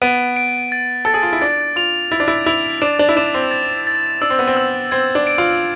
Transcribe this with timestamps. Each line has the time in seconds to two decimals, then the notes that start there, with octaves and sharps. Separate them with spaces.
0.02 B3 D7
0.37 D7
0.72 A6
1.05 A4 A6
1.14 G#4
1.23 F4
1.33 E4
1.41 D4 A6
1.76 F4 F7
2.12 E4 A6
2.20 D4
2.28 E4
2.46 E4 F7
2.82 D4 E7
2.99 D4
3.09 E4
3.17 D4 E7
3.34 C4
3.51 A6
3.87 A6
4.22 D4 E6
4.30 C4
4.39 B3
4.47 C4
4.57 E6
4.91 C4 G#6
5.15 D4
5.27 D7
5.38 F4